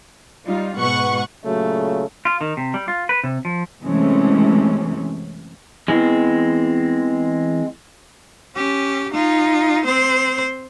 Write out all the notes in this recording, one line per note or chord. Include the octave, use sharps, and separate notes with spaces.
G3 D#4 F4
G#2 B2 B4 F#5 C#6
A#2 C#3 F#3 A3
F4
D#3
C3
G3
F4
B4
C3
F3
F#2 C3 E3 G#3 A3 C#4
E2 E3 G#3 C4
C#4 G4
D#4 F4
C4 C5